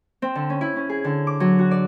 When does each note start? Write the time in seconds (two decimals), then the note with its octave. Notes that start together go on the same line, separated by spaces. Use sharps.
0.22 C4
0.35 D3
0.50 C#4
0.61 E4
0.76 C#4
0.89 G#4
1.04 D3
1.27 D6
1.40 F#3
1.59 F#4
1.71 D5